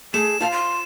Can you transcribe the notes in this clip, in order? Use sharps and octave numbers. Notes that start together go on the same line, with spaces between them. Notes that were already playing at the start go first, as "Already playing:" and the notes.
A3 G#4 E7
F4 C5 F5 A5
C6